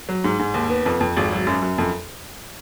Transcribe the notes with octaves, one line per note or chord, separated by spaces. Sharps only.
F#3
G#2
G#2
D#2
B3
F2
F2
G#1
F#3
F#2
F#2
F2